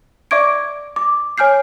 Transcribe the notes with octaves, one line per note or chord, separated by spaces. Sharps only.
D5 E5 C#6 D6 G#6 D7
D6
C#5 G#5 F6 G6 C7